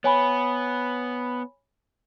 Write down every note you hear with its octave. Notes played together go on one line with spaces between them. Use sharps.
B3 C#5 G#5 B5